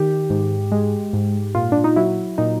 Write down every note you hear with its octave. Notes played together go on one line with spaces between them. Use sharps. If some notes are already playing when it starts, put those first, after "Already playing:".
Already playing: D#3 G4
G#2
G#3
G#2
A#2 F4
D4
D#4
F#3 E4
A#2 D#4